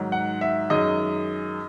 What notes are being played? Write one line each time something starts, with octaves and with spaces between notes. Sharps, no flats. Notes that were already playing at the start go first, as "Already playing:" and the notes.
Already playing: G#2 D#3 F#3
F#5
E5
F#2 D#3 G#3 D#5